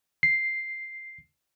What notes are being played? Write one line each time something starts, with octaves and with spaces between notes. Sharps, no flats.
C7